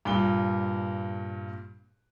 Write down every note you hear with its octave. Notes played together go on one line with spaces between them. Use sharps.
G2 A#2 G7